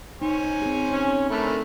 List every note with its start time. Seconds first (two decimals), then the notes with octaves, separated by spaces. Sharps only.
0.22 D#4 C5 C#5 G#5
0.62 C4 G#4
0.93 C#4
1.30 D3 A3 A#4 B5